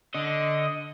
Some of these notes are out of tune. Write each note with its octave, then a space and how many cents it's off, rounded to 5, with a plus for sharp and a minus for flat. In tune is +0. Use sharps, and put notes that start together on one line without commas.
D3 +0 D#5 +10